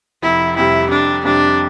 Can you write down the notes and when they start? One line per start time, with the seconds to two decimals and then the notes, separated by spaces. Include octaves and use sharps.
0.22 F1 E4
0.56 F2 C3 G3 E4
0.91 F1 D4
1.24 F2 C3 G3 D4